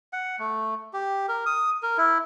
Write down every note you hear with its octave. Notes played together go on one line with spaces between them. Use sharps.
F#5
A3
G4
A#4
D#6
A#4
E4